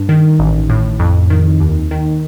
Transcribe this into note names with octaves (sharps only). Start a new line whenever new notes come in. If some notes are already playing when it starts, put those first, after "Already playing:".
Already playing: G2
D#3
A1
A2
F2
D#3
D#2
D#3